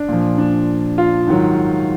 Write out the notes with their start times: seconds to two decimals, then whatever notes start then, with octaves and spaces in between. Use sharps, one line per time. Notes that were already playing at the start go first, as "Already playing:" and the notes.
Already playing: D4
0.09 A#2 F3
0.38 D4
0.98 F4
1.27 G#2 D#3 F#3